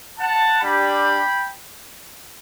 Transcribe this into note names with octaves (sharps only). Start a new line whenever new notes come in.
F#5 A5
G3 D4 G4 G5 B5